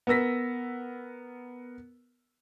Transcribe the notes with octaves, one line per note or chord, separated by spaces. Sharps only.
B3 A#4 E6 A#6 B6